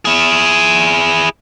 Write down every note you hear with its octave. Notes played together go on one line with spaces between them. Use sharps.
E4 G#4